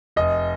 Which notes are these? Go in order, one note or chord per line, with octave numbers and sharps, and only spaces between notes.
F1 D#5